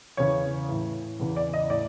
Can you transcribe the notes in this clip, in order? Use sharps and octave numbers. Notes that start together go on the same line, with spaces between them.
E2 C#3 E3 C#5
A2 E3
E2 C#3 E3
D5
D#5
A2 D5